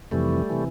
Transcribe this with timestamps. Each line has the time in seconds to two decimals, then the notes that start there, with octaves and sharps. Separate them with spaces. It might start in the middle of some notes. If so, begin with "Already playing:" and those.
0.11 F2 C3 E3 G3 A3
0.50 C3 E3